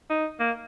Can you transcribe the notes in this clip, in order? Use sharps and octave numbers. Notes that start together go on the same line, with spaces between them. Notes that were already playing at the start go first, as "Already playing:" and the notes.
D#4
A#3